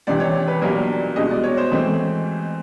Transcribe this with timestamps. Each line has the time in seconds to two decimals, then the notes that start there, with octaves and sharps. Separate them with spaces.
0.07 C#2 C3 E3 D5
0.20 C#5
0.48 B4
0.61 B1 A#2 G3 A#3 D4 A#4
1.16 C2 B2 G#3 D#5
1.31 D5
1.44 C#5
1.57 C5
1.72 G#2 E3 A3 C4